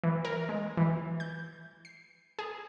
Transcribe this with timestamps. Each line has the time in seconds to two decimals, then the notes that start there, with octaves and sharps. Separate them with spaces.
0.04 E3
0.25 A#4
0.49 G#3
0.77 E3
1.20 G6
1.85 C7
2.39 G#4